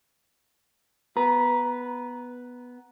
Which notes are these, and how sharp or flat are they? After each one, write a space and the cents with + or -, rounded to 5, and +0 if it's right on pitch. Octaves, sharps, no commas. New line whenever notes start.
B3 +0 B4 +0 A#5 +15